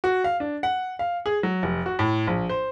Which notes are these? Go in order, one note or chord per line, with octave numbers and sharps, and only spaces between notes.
F#4
F5
D4
F#5
F5
G#4
F#3
F1
F#4
A2
A#1
C5